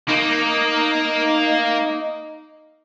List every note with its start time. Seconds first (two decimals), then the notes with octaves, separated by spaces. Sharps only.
0.08 A#3 D#4